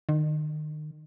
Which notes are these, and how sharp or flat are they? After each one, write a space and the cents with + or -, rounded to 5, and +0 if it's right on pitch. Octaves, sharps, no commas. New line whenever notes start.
D#3 -35